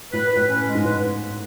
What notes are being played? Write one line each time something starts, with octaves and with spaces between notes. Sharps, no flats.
A2 B4
B4
A2
C#4
G#3
G#2
A2 B4